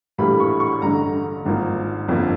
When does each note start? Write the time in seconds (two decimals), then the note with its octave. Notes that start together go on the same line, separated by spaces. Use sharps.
0.18 A#1 A2 E3 G3 A#3 B5
0.40 C#6
0.60 C#6
0.82 A1 G2 D3 A#5
1.46 G#1 G#2 F3 A#3
2.08 G1 F2 D3 F3 A#3